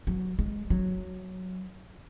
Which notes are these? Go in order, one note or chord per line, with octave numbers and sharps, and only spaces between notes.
F#3
G#3
F#3